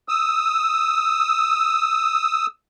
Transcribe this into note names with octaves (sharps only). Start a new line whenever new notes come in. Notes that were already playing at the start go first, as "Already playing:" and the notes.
D#6 E6